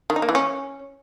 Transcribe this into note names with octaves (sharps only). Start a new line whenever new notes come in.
D#3
D#4
A#3
E3
C#4